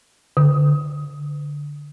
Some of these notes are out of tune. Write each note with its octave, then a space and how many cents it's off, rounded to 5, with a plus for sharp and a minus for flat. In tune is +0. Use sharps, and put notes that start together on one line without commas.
D3 -10